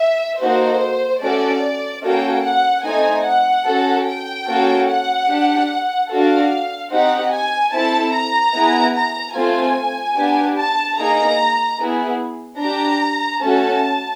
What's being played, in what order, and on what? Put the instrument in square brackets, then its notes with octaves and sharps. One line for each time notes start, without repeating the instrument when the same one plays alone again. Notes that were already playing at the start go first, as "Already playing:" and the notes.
Already playing: [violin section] E5
A#3 D#4 F#4 A4 C5
A3 C#4 F#4 A4 D5
A#3 C#4 F#4 A4 G5
F#5
A3 C4 D#4 G#5
F#5
C#4 F#4 A4
G5
A#3 C#4 F#4 A4
F#5
D4 G4
D4 F#4 A4 F5
C4 D#4 G4 F#5
G#5
C4 E4 A4 A5
A#5
B3 E4 G#4
A#5
A3 C4 F4 A4 G#5
B3 D4 G4
A5
A#3 D#4 G#4 A#5
B3 E4 G#4
D4 G4 A#5
A3 C#4 F#4 A4 A5